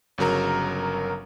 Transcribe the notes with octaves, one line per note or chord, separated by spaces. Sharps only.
G1 C#3 F#3 A#4 A#5